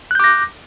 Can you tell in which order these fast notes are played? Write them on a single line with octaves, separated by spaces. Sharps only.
F#6 G6 D6 A#6